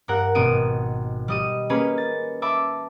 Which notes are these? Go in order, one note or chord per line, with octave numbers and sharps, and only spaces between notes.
G2 A#4 F#5
G#1 B2 B3 D7 D#7
G3 D#5 D#7
A#3 C#4 G#4 B4
A6
E5 A5 B5 D6